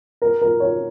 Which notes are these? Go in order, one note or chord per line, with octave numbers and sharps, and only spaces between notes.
A#4
A#4
C#5